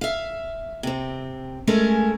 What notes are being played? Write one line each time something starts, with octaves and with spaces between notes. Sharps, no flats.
E5 F5
C3 C4
G#3 A3 C#4 A#4